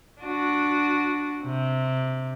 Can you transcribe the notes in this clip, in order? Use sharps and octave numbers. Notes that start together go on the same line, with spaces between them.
D4 F#4
C3